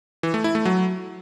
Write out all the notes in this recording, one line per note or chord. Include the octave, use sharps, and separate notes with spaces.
E3
A3
E4
A3
F#3